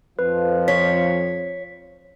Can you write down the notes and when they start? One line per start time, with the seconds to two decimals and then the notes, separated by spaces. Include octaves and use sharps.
0.19 F2 F3 B4
0.68 C#5 B6